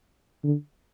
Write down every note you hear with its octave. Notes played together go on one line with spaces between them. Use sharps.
D3